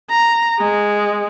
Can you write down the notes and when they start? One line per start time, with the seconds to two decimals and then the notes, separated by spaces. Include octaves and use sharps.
0.10 A#5
0.59 G#3